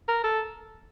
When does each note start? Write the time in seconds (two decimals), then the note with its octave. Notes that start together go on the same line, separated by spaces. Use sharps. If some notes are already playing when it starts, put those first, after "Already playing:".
0.08 A#4
0.24 A4